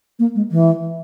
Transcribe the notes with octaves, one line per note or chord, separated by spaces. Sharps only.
A#3
G#3
E3